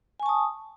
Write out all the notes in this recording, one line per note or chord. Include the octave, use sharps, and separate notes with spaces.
G#5 A5 C#6 D#6